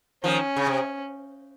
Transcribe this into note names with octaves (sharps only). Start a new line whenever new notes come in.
D#3 F3 C#4
C#3
C3